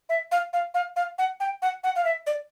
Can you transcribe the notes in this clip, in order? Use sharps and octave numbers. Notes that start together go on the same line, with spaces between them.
E5
F5
F5
F5
F5
F#5
G5
F#5
F#5
F5
E5
D5